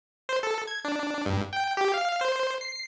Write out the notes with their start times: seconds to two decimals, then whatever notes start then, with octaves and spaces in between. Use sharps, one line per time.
0.29 C5
0.43 A4
0.67 G#6
0.85 D4
1.26 G2
1.53 G5
1.77 G4
1.94 F5
2.21 C5
2.61 C7